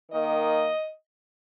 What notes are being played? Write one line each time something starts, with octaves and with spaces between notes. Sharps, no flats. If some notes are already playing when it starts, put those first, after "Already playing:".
D#3 A#3 D#5